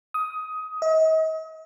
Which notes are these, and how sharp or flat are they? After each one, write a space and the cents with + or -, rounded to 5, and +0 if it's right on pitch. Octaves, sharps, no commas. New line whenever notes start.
D#6 +15
D#5 +40